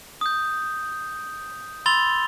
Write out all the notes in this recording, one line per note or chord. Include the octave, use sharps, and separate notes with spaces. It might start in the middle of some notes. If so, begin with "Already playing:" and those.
D#6 G6
B5 C6 E6 A6 F7 G7